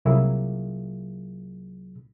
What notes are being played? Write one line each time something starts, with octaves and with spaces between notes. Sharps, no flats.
C2 F#3 A#3 E4 F4 G#4